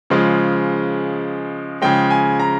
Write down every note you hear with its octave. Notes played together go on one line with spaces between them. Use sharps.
C#3 F3 G#3
C#3 F3 G#3 G5
G#5
A#5